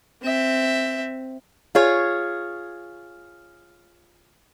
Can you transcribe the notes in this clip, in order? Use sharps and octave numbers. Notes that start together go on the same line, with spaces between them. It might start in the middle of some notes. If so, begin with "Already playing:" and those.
C4 E5
F4 G#4 C#5